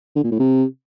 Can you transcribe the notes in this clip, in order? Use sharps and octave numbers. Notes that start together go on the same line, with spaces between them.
D3
A#2
A2
C3